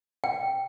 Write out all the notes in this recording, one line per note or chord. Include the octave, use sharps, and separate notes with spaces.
G5